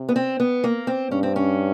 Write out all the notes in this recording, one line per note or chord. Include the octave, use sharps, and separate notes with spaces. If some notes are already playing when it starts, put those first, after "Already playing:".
Already playing: C3
B3
C4
B3
A#3
C4
G2 C#4
C4
C#4